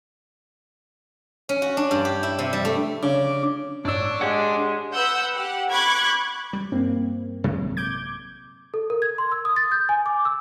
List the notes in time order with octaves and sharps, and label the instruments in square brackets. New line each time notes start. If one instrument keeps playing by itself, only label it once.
[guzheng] C#4
F#4
D4
G2
G4
E4
C3
G3
A3
[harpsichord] C#3 [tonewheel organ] D4 D6
[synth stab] G1 A2 E6 [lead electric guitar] D4 D5 [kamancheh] C#5
[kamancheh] G#3 [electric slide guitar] G4 C#5 F#5
[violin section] B4 F#5 E6 G6
G4 F#5
B5 C#6 D6 F#6 G#6
[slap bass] G3
[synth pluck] G2 A#3 C4
[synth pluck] A#1 [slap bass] C3 F#3 G#3
[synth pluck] D6 G6 G#6
[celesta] A4
A#4
G#6
C6
E6
D#6
A6
G6
G#5
D6
E6